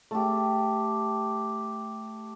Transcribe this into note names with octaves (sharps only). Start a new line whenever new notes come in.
A3 G4